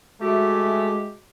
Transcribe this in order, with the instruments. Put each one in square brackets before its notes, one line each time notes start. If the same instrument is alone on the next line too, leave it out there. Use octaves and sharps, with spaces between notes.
[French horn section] G#3 [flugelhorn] A3 [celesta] F#4 E5 [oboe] G4